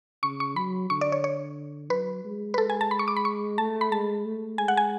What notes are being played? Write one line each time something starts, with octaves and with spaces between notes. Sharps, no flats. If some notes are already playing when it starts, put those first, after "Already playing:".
C#3 C#6
C#6
F#3 B5
D3 C#6
D5
C#5
C#5
F#3 B4
G#3
B4
G#3 A4
G#5
A5
B5
C#6
D6
B5
C#6
A3 A5
B5
G#3 A5
A3
G#3 G#5
F#5
G#5